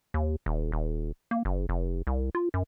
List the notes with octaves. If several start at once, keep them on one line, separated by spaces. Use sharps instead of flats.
D#2
D#1
D#1
A#3
F#1
F1
C2
F4
F#2